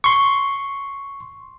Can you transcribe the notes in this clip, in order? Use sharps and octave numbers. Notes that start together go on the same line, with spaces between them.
C6 C#6